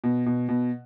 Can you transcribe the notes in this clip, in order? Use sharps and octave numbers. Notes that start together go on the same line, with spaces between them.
B2
B2
B2